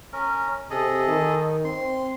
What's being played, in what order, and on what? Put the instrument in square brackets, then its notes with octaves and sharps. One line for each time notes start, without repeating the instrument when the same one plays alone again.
[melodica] C#4 A#4
[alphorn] C3 [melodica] G#4 A4 D#5
[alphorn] D#3
[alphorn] C4 [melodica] C6